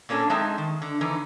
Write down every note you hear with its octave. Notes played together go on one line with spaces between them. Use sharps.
A#2 A#3 C#4 D4 A4
G#3 C4 D#4 G#4 E5 A5
D#3
D3
E2 D3 E3 D#4